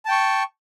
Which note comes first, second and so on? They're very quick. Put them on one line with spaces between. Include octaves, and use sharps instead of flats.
A5 G5 C#6